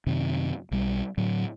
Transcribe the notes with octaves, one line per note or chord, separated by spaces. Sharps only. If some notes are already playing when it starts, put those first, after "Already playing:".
F#2 C3 D#3
B1 G3
A2 D3 F#3